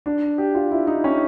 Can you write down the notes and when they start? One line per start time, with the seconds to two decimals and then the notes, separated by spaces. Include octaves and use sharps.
0.06 D4
0.38 G4
0.55 F4
0.71 E4
0.87 D#4
1.04 C#4